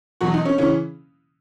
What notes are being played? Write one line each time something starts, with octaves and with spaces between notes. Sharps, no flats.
E2 B2 F#3 F#4
D#4
C#4
C#3 E3 C#4